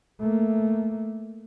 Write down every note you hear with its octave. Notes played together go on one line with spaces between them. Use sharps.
A3 A#3